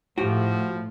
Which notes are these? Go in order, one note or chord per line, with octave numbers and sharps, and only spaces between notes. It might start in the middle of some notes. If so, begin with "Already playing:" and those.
A2 F3 F#4 G4